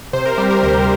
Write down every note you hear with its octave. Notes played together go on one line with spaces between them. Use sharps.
C3 C5
A#4
G3 G4
A#4
D2 A#4